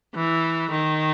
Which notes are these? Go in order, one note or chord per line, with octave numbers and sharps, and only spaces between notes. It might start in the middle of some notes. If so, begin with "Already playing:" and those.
E3
D#3